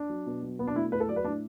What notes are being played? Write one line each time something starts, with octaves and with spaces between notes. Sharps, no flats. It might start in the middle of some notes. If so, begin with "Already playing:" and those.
Already playing: D4
F#3
B2
F#3
B2 B3
D4
A3 E4
A2 B4
A4
F#3 D5
B4
A2 D4